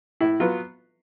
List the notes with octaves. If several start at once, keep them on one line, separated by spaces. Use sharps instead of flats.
A2 E4
F#3 B3 F4